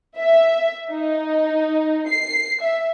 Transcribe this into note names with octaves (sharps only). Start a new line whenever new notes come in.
E5
D#4
C7
E5